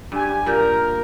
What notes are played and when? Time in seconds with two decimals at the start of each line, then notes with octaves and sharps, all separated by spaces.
0.12 G2 G4 G#5
0.46 A#2 G4 A#4